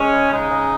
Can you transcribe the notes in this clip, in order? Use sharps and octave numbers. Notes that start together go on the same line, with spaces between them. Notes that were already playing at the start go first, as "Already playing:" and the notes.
Already playing: G#3 C#4
C#3
G#3 D#4
C#3